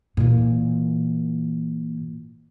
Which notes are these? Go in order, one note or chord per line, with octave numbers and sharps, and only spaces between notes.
A#2 E3